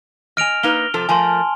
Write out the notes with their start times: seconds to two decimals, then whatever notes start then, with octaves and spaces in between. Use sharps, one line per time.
0.37 D#5 G#5 F6 D7 F7
0.63 A#3 D#4 B4 F7 G7
0.94 C3 F3 A4
1.09 F3 A3 A#4 G#5 A5 C6